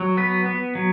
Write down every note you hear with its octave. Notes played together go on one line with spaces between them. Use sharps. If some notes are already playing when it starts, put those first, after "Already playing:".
Already playing: F#3
B3 B4
B3
F#3